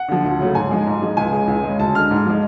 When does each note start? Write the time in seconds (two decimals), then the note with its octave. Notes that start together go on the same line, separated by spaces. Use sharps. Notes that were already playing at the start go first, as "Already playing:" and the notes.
Already playing: F#5
0.08 D3 F3
0.24 D2
0.39 C#3 F#3 A3
0.55 G#2 G#5
0.71 F3 G#3
0.86 G#2
1.02 F3 G#3
1.17 C#2 G#5
1.32 C#3 G#3
1.47 C#2
1.63 G#3
1.69 C#3
1.79 D2 A5
1.95 D3 G#3 F6
2.11 G#2
2.25 F3 G#3